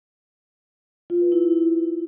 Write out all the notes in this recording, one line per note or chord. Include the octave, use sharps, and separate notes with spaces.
F4
B4
E4